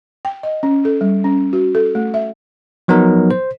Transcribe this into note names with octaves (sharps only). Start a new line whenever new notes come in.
G5
D#5
C#4
A4
G3
C#4
F#4
A4
A3
E5
F3 F#3 B3 D#4 A#4
C5